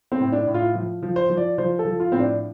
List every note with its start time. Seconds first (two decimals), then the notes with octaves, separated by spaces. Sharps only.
0.12 C4
0.20 A2
0.32 D4
0.47 A2
0.54 F4
0.75 F3
1.03 F3
1.16 C5
1.30 F3
1.37 D5
1.58 F3 C5
1.79 A4
1.85 F3
2.00 F4
2.12 A2 C4
2.20 D4